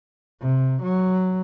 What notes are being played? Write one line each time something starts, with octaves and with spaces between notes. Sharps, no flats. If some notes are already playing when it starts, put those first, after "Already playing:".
C3
F#3